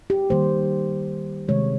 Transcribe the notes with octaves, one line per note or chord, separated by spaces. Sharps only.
G4
D#3 G3 A#3 C5
C3 D#3 G#3 C#5